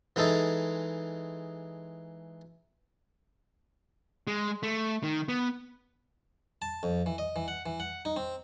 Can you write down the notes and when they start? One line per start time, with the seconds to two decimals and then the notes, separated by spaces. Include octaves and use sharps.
0.16 E3 G#3 D#4 A4
4.27 G#3
4.63 A3
5.03 D#3
5.29 B3
6.62 A5
6.83 F2
7.06 E3
7.18 D#5
7.36 E3
7.48 F#5
7.66 E3
7.80 F#5
8.05 D#4
8.16 C4